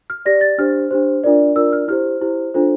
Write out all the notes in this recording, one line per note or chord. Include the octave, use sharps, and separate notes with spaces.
F6
G4 D5 A#6
A6
D4 G4 C5 F6
D4 G4 C5
D4 F4 A#4 D5
D4 F4 A#4 D5 E6
F6
E4 G4 C5 F6
E4 G4 C5
D4 F4 A4 C5